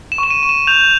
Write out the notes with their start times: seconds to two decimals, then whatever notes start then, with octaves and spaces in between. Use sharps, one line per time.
0.12 E7
0.18 C#6
0.23 E7
0.30 D#7
0.43 C#6
0.49 E7
0.67 G6 F7